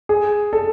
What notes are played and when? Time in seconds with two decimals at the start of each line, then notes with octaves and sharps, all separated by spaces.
0.09 G#4
0.53 A4